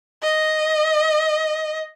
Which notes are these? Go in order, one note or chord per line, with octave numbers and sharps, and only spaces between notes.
D#5